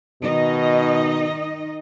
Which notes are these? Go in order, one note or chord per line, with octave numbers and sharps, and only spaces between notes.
B2 D#3 D#4 D#5